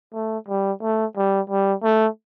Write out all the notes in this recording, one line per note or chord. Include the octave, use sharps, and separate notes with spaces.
A3
G3
A3
G3
G3
A3